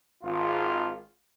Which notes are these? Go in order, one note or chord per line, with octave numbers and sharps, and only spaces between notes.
G#1 F4